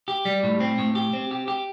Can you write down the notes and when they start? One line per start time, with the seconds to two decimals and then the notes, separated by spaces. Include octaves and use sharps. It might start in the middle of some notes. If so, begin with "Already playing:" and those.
0.08 G4
0.25 G3
0.43 A2
0.60 C4
0.78 A2
0.95 G4
1.13 C4
1.31 G4
1.48 G4